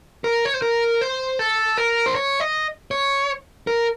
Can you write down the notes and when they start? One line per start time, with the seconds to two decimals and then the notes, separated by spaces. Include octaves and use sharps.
0.24 A#4
0.45 C#5
0.54 C5
0.62 A#4
1.01 C5
1.39 A4
1.78 A#4
2.06 C5
2.15 C#5
2.40 D#5
2.91 C#5
3.67 A#4